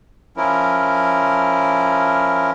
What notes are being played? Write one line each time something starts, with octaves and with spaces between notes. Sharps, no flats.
F3 C#4 E4 A#4